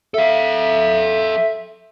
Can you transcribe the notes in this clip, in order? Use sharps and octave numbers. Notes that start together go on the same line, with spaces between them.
A4 E5 F5